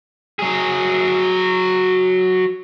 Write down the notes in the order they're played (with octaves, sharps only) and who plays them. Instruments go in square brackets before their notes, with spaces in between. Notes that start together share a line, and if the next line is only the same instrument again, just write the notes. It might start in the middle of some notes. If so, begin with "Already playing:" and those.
[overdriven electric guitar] F#3 G#4